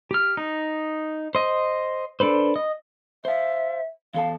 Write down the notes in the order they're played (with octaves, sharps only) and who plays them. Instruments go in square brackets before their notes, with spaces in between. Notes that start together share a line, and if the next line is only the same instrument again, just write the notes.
[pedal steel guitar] G4 F6
D#4
C5 D#5
D4 A4 B4 C5
D#5
[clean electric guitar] C5 F5 [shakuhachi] E5
[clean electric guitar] E2 A4 A5 [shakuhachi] F5